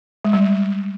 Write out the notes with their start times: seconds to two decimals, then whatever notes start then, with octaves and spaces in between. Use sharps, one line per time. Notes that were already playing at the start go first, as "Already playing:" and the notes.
0.25 G#3
0.33 G3